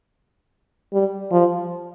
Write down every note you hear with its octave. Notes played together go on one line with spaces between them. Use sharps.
G3
F3